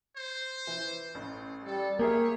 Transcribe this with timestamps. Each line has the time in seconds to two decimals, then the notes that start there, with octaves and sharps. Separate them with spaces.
0.16 C5
0.67 E3
1.15 A1
1.65 G3 A4
1.99 A#3 G4 G#4 A#4 C#5 E5